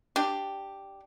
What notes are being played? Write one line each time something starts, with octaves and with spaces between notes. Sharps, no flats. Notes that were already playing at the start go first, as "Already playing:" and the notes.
D4 G4